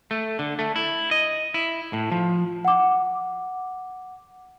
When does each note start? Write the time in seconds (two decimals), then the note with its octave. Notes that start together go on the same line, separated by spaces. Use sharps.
0.11 A3
0.39 D3
0.59 A3
0.76 E4
1.11 D#5
1.54 E4
1.93 A2
2.12 F3
2.65 F#5 D6